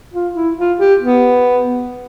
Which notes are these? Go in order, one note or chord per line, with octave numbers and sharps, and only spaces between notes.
F4
E4
F4
G4
B3